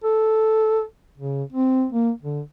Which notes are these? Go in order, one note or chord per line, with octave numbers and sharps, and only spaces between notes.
A4
C#3
C4
A#3
D3